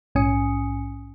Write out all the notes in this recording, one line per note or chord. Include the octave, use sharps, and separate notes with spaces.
A#1 G#2 C#4 G#5 D#6 C#7